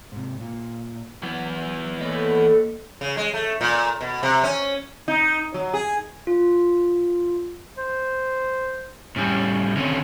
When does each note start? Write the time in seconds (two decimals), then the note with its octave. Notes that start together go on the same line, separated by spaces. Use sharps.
0.12 G#2 C3
0.40 A#2
1.23 E3 F#3 B3
1.99 A2 A3 A#3 D#5
3.01 C#3
3.17 G#3
3.34 A3
3.61 A#2
4.01 B2
4.23 C3
4.44 C#4
5.08 D#4
5.54 F#3
5.74 G#4
6.27 F4
7.77 C5
9.16 A2 G3 C#4
9.77 D3 D#3 C4 C#4